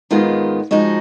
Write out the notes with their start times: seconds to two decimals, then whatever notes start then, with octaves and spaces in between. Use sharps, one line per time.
0.11 G#2 D#3 G#3 B3 F4
0.71 F3 G#3 D#4 F#4